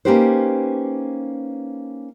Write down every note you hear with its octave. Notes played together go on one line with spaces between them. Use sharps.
A#3 C#4 D#4 G4 B4 C5